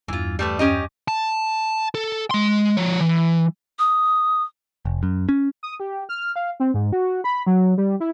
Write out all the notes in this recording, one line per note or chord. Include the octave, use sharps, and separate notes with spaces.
E2 G2 E3 F4
G3 A3 B4
C#4 G4 D#5
A5
A4
G#3 C6
F3 C#5
E3
D#6
F1
F#2
C#4
D#6
G4
F6
F5
C4
G#2
F#4
B5
F#3
G3
E4